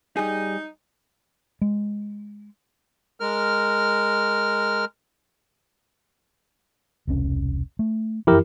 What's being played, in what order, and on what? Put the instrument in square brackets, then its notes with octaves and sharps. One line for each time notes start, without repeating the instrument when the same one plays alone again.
[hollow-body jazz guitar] G3 G#4 [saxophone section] D#4
[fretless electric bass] G#3
[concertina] G#3 A#4 F6
[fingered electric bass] E1 C2 C#4
A3
[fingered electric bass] F#2 E3 F3 [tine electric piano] E4 G4 A#4